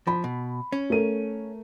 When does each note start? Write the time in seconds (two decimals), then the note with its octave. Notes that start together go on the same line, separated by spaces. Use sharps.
0.07 F3 B5
0.24 B2
0.72 C#4
0.90 A3 A#4 D#7